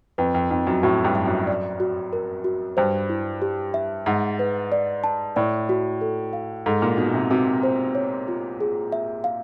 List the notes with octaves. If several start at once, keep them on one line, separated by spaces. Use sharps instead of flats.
F2 B4
F2
F2 D#4
F#2
A2 F#4
G2
E5
F#2
D5
F#4
A#4
F#4
G2 C5
E4
G4
E5
G#2 F#5
B4
D5
A5
A2 D5
F#4
A4
F5
G#2 A4
A#2
B2 D#4
C3
C3 F#4
C5
C#5
F4
G#4
E5
F5